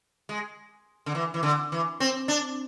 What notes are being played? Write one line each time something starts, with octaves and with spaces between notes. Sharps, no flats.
G#3
D3
E3
E3
D3
E3
C4
D4